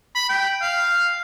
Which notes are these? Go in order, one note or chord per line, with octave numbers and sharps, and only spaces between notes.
B5
G5
F5